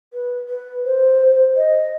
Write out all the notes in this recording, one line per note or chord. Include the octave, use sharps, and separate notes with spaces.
B4
B4
C5
D#5